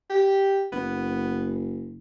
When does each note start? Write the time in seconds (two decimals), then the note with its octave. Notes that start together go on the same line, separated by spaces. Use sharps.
0.10 G4
0.72 F#1 B3